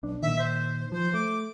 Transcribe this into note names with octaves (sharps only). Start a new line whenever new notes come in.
B1 D4
A#2 D#3 E5
C5
F3 C5
A3 D6